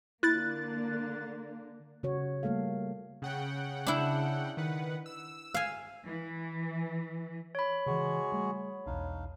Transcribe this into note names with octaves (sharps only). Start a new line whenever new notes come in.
D3 A#3 E4 F#6 A6
C#3 F#4 C#5
G3 A3 A#3 A4 F5
C#3 F#5 G5
D4 E4
D#3 B4 F#5
E6
F5 G#5
E3
C#5 B5
C#3 E3 G#3 F#4 G#4
G3 A3
B1 E2 D4 D#4 F5